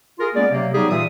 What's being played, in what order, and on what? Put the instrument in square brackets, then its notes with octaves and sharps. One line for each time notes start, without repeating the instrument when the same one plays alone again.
[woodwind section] F4 G#4 A#4
G#3 A#3 B3 C#4 D5
C3 F#3 A#3
F#3 G3 B3 D#4 G4 G#4
A#2 E3 F4 E5 D#6